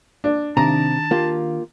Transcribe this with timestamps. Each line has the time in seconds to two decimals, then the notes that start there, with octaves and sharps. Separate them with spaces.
0.24 D4
0.57 C3 D#3 D4 A5 A#5
1.11 A#3 F4 G4